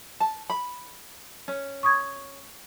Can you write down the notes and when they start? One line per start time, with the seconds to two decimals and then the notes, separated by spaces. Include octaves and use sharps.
0.20 A5
0.50 B5
1.48 C#4
1.83 C#6 D#6 G#6